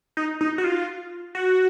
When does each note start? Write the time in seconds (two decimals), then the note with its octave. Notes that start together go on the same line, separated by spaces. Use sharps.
0.17 D#4
0.41 D#4
0.58 F#4
0.64 F4
1.35 F#4